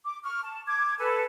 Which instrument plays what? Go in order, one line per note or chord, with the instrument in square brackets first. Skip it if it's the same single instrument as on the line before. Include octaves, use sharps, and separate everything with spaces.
[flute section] D6
C#6 F6
A5
D6 G#6
A4 B4 G#5